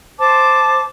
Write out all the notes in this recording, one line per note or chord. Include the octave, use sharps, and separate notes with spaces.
C5 A5 D6